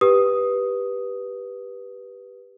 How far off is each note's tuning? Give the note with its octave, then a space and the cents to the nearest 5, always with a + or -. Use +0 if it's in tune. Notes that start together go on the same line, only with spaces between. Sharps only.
G4 +0 B4 -10 D#6 +0